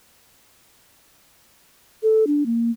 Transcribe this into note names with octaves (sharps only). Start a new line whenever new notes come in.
A4
D4
A#3